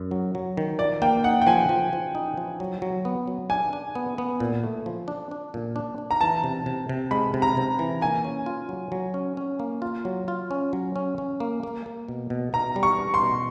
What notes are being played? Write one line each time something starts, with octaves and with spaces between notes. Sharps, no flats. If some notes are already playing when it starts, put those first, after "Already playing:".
Already playing: F#2
F#3
F#3
D#3
F3 D5
A#3 G5
D#4 F#5
G5
F3 G#5
F3
F3
D#4
F3
F#3
F#3
B3
F#3
D4 G#5
D4
B3
B3
A#2
A3
F3
D4
D4
A#2
D4
D4
A#5
E3 A5
C3
C3
C3
G#3 B5
C3
A#5
C3
E3
A#3 G#5
C#4
F4
F#3
F#3
C#4
C#4
A#3
F4
F#3
F4
C#4
F#3
C#4
C#4
A#3
A#3
A#3
B2
B2
B2 A#5
G3
C#6
D4
C6
B2